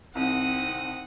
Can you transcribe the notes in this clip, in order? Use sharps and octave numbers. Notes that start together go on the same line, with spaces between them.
C2 C4 D#4 F#5 D#6